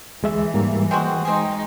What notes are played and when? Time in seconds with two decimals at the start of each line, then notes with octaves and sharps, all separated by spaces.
0.23 D2 E3 G#3 E5
0.54 G#2 G3 A#3
0.91 G#3 C4 F#4 G5
1.25 G#3 C4 D#4 G#4